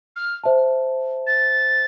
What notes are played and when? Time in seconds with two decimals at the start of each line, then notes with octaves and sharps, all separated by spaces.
0.16 F6
0.44 C5 E5 A5
1.27 A6